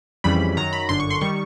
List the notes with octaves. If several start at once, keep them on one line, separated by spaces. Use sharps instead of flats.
F2 C#3 E3 G3 B5
F#2 D#3 F#3 A#5
B5
G1 F#2 D3 C6
C#6
C6
D#3 G3 C#6